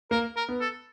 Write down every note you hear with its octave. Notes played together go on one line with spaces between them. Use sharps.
A#3 A#4
A#4
B3
A4